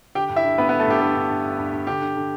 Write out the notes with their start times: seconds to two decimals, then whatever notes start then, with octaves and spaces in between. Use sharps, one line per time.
0.15 D3 G4 G5
0.29 G2
0.36 E4 E5
0.44 D3
0.58 G2 B3 B4
0.69 B3 B4
0.73 D3
0.80 A3 A4
0.87 G2 G4
1.01 D3 A3 A4
1.16 G2
1.30 G2
1.44 G2
1.59 G2
1.73 G2
1.87 D3 G4
2.01 D3
2.17 D3